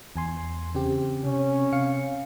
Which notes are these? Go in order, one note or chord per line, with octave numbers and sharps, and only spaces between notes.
E2 G#5 C6
C#3 C4 G4
C3 C#4
C3 F5 C#7